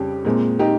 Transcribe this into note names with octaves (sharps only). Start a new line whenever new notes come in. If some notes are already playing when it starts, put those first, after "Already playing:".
Already playing: F2 C#3 G3 G4
A#2 G#3 C4
D#4 G4